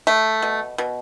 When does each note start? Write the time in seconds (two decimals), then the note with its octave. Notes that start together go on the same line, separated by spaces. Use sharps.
0.07 A3
0.42 B2
0.78 B2